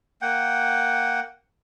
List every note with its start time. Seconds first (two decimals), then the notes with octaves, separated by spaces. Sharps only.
0.22 A#3 F#5 G5